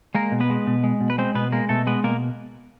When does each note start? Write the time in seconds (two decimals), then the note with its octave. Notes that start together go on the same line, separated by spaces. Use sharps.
0.15 G#3 A#3 A#4
0.32 B2
0.40 B3 B4
0.50 G#3
0.67 B2
0.84 G#3
1.01 B2
1.10 B4
1.18 G#3 C4 C5
1.35 B2 B3 B4
1.52 G#3 A#3 A#4
1.69 B2 A3 A4
1.87 G#3 B3 B4
2.04 B2 A#3 A#4